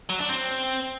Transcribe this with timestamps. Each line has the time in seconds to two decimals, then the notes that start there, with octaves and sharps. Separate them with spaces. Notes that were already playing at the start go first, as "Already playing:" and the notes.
0.09 F#3
0.19 D4
0.29 C4